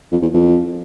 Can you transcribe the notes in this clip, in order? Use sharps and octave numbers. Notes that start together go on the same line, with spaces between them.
F2
E2
F2